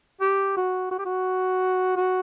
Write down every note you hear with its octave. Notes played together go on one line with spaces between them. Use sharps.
G4
F#4
F#4
G4
F#4
F#4